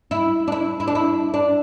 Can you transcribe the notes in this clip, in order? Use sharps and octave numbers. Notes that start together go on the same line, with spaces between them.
E4
D4
E4
E4
D4
E4
D4